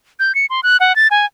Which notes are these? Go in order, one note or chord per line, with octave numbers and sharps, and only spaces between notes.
G6
C#7
C6
F#6
F#5
A6
G#5